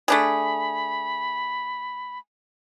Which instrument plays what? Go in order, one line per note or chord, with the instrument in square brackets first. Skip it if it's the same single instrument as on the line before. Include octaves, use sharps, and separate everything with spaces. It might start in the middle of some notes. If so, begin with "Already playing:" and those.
[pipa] A3 D4 G#4 [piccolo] B5